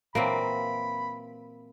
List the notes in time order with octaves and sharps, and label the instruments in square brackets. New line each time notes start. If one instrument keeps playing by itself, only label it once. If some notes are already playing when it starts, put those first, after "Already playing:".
[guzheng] A#2 E3 F#3 [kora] A#3 C4 [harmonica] B5